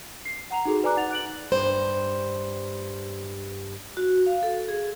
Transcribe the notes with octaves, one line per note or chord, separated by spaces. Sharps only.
C7
F#5 A#5 F7
D#4 F#4 G#4 A4
B4 D5 G#5 A#5 D6 F#6
D#4 F#5 A6 F7
F#6 D7 F#7
G2 C5
F#4
F5
A4
G#4